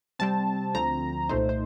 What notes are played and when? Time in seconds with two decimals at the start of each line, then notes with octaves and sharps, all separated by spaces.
0.19 C3 G3 C4 A5
0.74 D2 D3 F3 C4 A#5
1.29 C2 A#2 A3 D#4 C5
1.49 C5